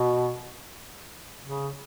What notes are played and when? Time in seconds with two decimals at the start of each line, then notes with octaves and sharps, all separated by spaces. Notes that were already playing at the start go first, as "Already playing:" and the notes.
Already playing: B2
1.45 C#3